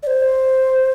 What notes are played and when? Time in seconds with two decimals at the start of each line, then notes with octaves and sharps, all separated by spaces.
0.03 D5
0.07 C5